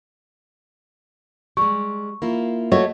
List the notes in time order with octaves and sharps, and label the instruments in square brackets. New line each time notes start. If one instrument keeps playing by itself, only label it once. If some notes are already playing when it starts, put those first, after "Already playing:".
[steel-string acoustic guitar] G3 G#3 [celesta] C#6
[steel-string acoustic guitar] A#3 E4 F4
[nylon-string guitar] A3 F#4 C#5 [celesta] D#5